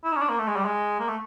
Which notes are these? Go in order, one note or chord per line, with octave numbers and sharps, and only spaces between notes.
E4
D#4
C#4
D4
A#3
A3
G#3
G3
G#3
A#3
A3